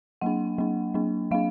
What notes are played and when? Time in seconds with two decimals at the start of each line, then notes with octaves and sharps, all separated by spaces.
0.21 F#3 A#3 D4 F#5
0.58 F#3 A#3 D4
0.94 F#3 A#3 D4
1.31 F#3 A#3 D4 F5